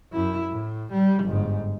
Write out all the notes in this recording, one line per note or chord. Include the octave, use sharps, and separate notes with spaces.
F#2 E4
A2
G3
G1 G#2